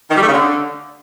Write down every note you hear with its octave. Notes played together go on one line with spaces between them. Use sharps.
D#3
G3
A3
C#3
D3